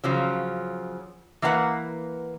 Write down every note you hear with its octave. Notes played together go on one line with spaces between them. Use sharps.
C#3 F3 F#3
E3 A#3 B4 F5 F#5